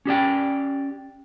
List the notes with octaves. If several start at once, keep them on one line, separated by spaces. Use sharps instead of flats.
C#4 G4 D5 G5